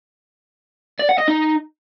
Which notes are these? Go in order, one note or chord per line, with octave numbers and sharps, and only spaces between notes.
D5
F#5
D#5
D#4